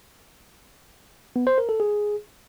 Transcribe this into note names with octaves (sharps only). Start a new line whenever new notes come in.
B3
C5
A#4
A4
G#4